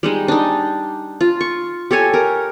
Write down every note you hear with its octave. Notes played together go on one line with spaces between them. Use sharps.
G3 G#3 D#4
D4 D#4
F4
C#6
G4 A4 C#5 G#5
A#4